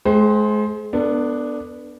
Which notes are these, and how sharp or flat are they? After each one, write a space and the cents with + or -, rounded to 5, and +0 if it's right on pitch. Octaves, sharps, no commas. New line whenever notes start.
G#3 +35 C5 +0 G5 +0
B3 +0 D4 +0 A4 +40